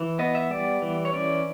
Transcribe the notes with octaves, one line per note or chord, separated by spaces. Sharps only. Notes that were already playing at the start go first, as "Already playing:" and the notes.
Already playing: E3
B3 D#5
E5
G3 D5
E3
C#5
C#4 D5